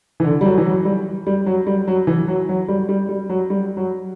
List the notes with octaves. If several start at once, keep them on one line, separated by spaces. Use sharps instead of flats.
E3
D3
G3
F#3
E3
F#3
G3
G3
F#3
G3
F#3
E3
F#3
F#3
G3
G3
G3
F#3
G3
F#3